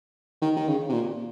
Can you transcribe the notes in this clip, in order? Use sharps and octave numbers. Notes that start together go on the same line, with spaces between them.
D#3
D#3
C#3
C3
A#2